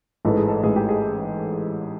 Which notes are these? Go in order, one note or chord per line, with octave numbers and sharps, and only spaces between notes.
A1 G#2 E3 A3 A4
G#4
A4
A1 G#2 E3 A3 G#4
G4
G#4